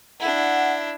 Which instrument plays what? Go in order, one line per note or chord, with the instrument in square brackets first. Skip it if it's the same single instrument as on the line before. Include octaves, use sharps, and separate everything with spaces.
[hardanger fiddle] D4 E4 [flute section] F#5